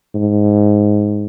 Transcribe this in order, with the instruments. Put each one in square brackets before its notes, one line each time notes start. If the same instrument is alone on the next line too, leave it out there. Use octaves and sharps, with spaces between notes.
[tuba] G#2